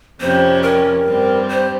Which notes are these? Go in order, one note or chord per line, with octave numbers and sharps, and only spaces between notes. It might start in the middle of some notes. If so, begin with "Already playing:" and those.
F2 C3 G3 C#4 C5
A#4
G2 G3 C4
C5